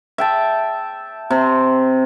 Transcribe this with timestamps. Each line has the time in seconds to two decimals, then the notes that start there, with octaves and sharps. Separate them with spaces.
0.18 E5 G5 A5
1.30 C3 C4